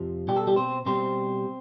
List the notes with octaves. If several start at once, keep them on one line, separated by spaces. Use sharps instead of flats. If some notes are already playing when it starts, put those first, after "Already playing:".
Already playing: F2 C3 F3
B2 G3 G4
A4
G3 G4
C4 C5
B2 G3 C4 C5